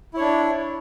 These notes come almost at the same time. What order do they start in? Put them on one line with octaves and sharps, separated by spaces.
E4 C#5 D4